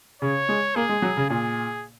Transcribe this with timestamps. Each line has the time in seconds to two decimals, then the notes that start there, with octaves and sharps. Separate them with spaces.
0.22 C#3 C#5
0.49 G#3
0.76 A#3 G#4
0.89 G#3
1.02 F#3
1.17 C#3
1.29 A#2 G#4